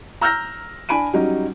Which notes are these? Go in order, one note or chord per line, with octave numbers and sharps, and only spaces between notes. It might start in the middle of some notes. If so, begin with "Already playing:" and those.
A#5 E6 F6 G6 A#6
D4 G#5 B5 D7 D#7
F#3 G3 C#4 D#4